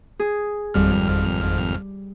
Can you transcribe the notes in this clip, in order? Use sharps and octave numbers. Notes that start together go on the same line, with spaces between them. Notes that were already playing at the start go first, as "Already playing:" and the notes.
G#4
G#1 F2 G3 F6